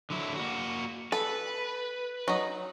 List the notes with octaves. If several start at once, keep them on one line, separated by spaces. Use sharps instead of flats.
D3 F#3 E4
A#3 F#4
A4 B4
F#3 D#4